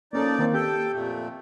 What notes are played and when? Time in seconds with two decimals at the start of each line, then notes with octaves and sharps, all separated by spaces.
0.13 F3 A#3 C#4 D#4 A4 D5
0.39 D#3 A#3 C4
0.54 G4 A4 G5
0.92 F2 A#2 A3